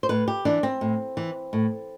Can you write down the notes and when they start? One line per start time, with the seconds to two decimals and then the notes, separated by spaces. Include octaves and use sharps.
0.03 C5
0.09 A2 B4
0.28 G4
0.45 E3 D4
0.63 C4
0.81 A2
1.17 E3
1.53 A2